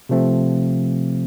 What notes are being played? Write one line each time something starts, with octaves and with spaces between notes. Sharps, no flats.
C3 F3 A3 C4